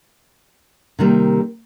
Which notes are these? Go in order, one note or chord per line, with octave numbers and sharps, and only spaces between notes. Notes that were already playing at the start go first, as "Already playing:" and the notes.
C3 D#3 G3 A#3